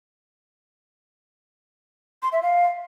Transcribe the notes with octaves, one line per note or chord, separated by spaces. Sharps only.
C6
E5
F5